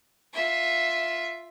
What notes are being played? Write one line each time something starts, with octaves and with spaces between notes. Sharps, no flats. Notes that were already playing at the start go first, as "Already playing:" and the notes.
F4 E5